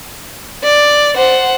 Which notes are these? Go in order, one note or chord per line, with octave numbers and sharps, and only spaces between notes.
D5
C5 F#5